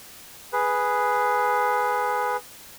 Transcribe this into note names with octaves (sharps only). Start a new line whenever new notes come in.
G#4 B4